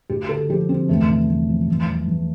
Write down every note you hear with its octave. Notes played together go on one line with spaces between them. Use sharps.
D2 G4
D3 A4
F3 G4
D3 C4
E2 A3
C3
E2
F3
E2
E2
E2